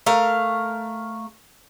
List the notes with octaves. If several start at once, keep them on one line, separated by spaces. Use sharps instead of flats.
A3 A#4 F5